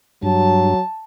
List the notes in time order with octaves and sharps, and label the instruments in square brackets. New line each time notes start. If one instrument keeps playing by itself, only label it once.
[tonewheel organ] G2 [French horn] F#3 [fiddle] A5